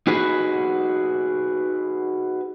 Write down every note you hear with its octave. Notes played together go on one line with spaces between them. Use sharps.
D#4 F#4 G#4 B4